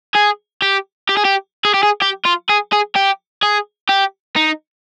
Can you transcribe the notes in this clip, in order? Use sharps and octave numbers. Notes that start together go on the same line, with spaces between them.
G#4
G4
G4
G#4
G4
G#4
G4
G#4
G4
F4
G#4
G#4
G4
G#4
G4
D#4